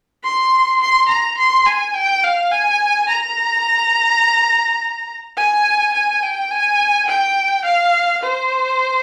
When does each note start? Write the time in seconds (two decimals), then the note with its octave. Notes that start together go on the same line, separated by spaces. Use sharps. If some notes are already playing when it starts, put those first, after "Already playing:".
0.24 C6
0.80 C6
1.08 A#5
1.38 C6
1.66 G#5
1.95 G5
2.24 F5
2.52 G#5
3.09 A#5
5.37 G#5
5.94 G#5
6.23 G5
6.51 G#5
7.07 G5
7.65 F5
8.23 C5